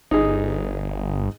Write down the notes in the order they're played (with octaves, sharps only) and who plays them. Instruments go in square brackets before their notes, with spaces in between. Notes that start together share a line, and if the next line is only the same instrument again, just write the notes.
[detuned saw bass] G1 [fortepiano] D#4 G#4